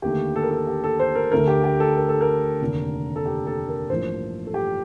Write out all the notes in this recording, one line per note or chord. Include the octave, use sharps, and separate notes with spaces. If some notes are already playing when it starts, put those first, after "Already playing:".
D#2 D3 A3 G4
A4
A#4
A4
G4
A4
C5
A#4
D2 D3 A3 A#4
G4
G4
A4
A#4
A4
A#4
F1 D#2 D3
A4
G4
A4
A#4
A1 G2 F3 A#3 C5
A4
G4